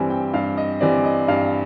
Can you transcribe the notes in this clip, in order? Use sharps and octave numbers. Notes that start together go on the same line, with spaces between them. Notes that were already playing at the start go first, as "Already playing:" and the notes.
Already playing: G2 E3 G3 C4 G#5
G5
G2 F5
D#5
E3 G3 C4 D5
D#5
G2 F5